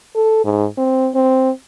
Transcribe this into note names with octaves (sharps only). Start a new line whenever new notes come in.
A4
G#2
C4
C4